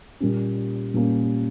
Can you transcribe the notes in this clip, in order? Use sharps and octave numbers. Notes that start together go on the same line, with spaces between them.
A#2 G3 A#3 C#4
A#2 G3 A#3 C#4